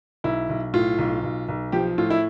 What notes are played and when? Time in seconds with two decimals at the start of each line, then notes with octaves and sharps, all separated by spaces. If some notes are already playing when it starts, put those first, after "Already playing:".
0.24 B1 E4
0.49 B1
0.74 A2 F4
0.98 B1
1.23 B1
1.48 B1
1.72 F3 G4
1.98 A2 F4
2.10 E4